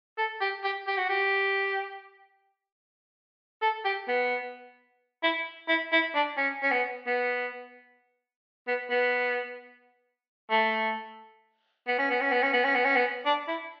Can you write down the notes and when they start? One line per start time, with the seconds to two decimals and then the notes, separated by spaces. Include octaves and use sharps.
0.18 A4
0.41 G4
0.64 G4
0.87 G4
0.98 F#4
1.09 G4
3.62 A4
3.85 G4
4.08 B3
5.23 E4
5.68 E4
5.92 E4
6.15 D4
6.37 C#4
6.62 C#4
6.71 B3
7.06 B3
8.67 B3
8.90 B3
10.51 A3
11.88 B3
11.99 C#4
12.10 B3
12.21 C#4
12.32 B3
12.43 C#4
12.53 B3
12.64 C#4
12.75 B3
12.85 C#4
12.96 B3
13.26 D4
13.48 E4